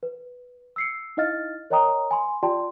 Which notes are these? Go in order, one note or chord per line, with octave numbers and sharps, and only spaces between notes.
B4
E6 C7 C#7
D#4 E4 D#5 F5 F6 A6
A#4 C#5 D#5 G5 A#5 D#6
G#5 B5 C6
F4 G4 D5 G5 A5 C6